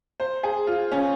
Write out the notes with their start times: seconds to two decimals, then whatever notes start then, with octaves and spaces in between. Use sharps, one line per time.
0.20 C5
0.43 G#4
0.67 F4
0.92 C#4